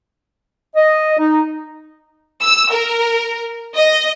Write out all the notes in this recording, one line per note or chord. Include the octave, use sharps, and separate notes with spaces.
D#5
D#4
E6
A#4
D#5